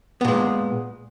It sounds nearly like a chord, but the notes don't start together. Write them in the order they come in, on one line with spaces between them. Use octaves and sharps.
B3 A#2 G#3